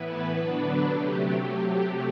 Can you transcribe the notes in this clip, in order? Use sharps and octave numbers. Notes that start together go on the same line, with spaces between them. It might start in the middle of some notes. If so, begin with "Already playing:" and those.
Already playing: A2 E3 B3 E4 B4
D3 F#3 B3 D4
C3 F#3 A3 G4